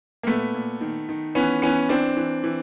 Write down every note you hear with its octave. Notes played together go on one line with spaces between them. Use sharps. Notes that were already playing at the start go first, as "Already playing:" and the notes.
A#3
A#2 A3 B3
A#2
D#3
D#3
E3 B3 C#4
E3 B3 C#4
E3 C4 D4
E3
E3